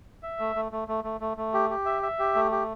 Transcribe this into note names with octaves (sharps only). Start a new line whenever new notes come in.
E5
A3
A3
A3
A3
A3
A3
A3
G4
G4
E5
E5
G4
A3
G4